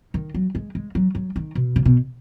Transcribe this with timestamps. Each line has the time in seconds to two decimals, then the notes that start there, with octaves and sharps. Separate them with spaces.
0.14 D#3
0.34 F#3
0.55 G#3
0.75 G#3
0.95 F#3
1.15 F#3
1.36 D#3
1.55 B2
1.76 C#3
1.85 B2